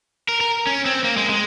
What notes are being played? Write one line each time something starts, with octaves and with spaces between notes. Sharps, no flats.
A#4
A#4
C#4
C4
A#3
G#3
G#3